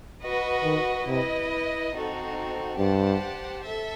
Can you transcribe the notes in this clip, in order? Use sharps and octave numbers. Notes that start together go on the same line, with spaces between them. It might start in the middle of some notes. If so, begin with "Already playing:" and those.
F#4 B4 D#5
D#3
C3 E4 B4 D#5
C4 D#4 F#4 A4
G2 G4 C5 F#5 A5
A4 E5